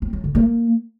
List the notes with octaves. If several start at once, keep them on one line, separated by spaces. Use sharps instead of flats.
C4
F#3
D3
A#3